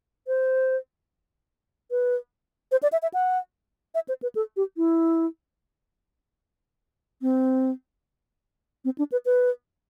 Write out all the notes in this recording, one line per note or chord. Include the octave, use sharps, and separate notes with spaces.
C5
B4
C5
D5
E5
E5
F#5
E5
C5
B4
A4
G4
E4
C4
C4
D4
B4
B4